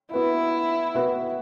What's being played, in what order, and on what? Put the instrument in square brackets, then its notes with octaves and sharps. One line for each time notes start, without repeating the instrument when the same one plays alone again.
[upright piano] B3 F#4 B4 E5 [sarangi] E4
[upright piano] B3 F#4 B4 E5